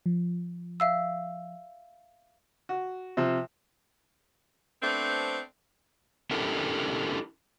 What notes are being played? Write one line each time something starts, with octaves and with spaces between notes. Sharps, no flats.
F3
E5 F5 E6
F#4
C3 F3
A3 B3 C4 D4 C5
C#4 D4 E4 G4 A4 A#4